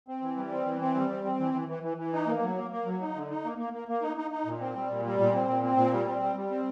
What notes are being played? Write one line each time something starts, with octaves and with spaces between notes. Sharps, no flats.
C4
E3
G3
C4
E3
C4
G3
C4
C4
E3
E3
E3
E3
E3
D#4
A#3
F#3
A#3
A#3
F#3
D#4
D3
D#4
A#3
A#3
A#3
A#3
D#4
D#4
D#4
A#2
C4
G3
A#2
G3
A#2
C4
A#2
C4
A#2
G3
C4
G3
G3
C4